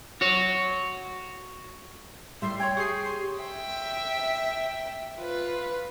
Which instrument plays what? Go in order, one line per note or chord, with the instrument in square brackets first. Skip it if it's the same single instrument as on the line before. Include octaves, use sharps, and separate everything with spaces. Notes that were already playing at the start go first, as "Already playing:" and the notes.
[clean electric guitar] F#4 C#5
[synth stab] A2 G3 E5 [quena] C6
[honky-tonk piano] C#5 G5 [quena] G#6
[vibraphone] G4 [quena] G#4 [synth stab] C#6 C7
[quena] C6
[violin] E5 G5
F4 B4